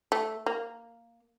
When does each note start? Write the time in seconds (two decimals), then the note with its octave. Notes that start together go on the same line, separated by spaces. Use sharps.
0.12 A3
0.46 A#3